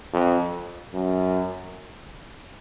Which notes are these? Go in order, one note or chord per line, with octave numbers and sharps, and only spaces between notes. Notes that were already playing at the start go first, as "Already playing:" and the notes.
F2
F#2